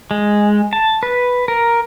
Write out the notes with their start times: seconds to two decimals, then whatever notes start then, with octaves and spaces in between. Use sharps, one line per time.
0.11 G#3
0.73 A5
1.03 B4
1.48 A#4